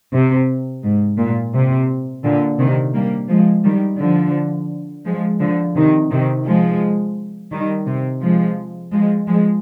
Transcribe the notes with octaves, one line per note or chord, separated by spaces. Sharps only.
C3
G#2
A#2
C3
A#2 D3
C3 D#3
G3 A#3
F3 G#3
D#3 G3
D3 F3
F3 G#3
D3 F3
C3 D#3
C3 D#3
F3 G#3
D#3 G3
C3
F3 G#3
F3 G#3
F3 G#3